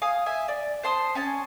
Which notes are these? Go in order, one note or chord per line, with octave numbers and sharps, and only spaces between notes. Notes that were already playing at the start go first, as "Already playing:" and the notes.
F5 G#5 D#6
E5 G#5
D5
C5 A5 C6 D#6
C#4 G#5 A5